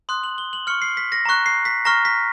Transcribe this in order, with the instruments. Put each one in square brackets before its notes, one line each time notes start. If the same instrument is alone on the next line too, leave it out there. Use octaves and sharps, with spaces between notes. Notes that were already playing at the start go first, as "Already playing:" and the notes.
[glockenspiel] C6 D#6 F#6
F#7
G7
F#7
C#6 F6 C#7
C7
B6
A#6
A#5 C#6 F#6
C7
B6
A#5 C#6 F6 A#6
B6